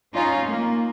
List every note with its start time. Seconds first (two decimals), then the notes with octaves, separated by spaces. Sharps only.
0.13 C#4 D#4 F4
0.45 A#3